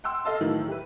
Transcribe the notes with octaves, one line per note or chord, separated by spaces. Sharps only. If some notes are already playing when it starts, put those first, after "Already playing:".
F#5 G5 C6 E6
A4 D#5 F5 A5
A2 D#3 E3 F#3
G4 B4